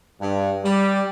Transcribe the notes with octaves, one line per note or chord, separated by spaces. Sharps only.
G2
G3